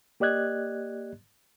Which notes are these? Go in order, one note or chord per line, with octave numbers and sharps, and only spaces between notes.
A#3 G4 D5 D#5 F#6 G#6